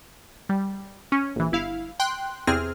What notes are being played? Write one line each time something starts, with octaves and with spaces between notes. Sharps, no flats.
G3
C#4
A#1 E3
G1 E4 F5
G5 C6 F#6
E2 C3 C4 G#4 F6